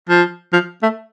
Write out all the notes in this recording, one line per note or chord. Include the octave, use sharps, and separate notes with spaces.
F3
F3
A3